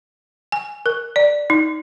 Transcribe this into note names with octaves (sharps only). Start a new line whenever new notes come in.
G#5
A#4
D5
D#4